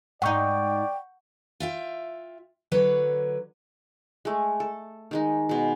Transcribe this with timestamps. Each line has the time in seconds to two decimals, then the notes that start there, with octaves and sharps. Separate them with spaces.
0.22 G#2 D#4 D5 F#5 G5 C#6 G6
1.60 F4 E5 G5
2.72 D3 F#3 B4 C#5
4.25 G#3 A3
4.60 A4
5.11 D#3 G#3 D#4
5.49 B2 G#3